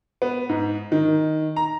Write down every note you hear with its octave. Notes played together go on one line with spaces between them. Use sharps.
B3
G#2
D#3
A#5